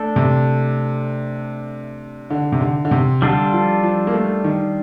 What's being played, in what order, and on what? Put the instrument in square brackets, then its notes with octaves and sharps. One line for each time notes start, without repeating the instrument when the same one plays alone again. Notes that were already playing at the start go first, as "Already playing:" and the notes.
Already playing: [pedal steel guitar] A3 D4 A4
[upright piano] C3
D3
C3
D3
D3
C3
[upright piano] D3 [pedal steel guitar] G3 D4 F4 A4
[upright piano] F3
F3
A#3
A3
D#3